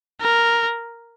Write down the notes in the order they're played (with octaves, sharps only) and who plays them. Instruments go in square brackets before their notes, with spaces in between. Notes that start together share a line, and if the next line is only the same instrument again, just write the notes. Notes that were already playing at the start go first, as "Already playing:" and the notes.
[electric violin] A#4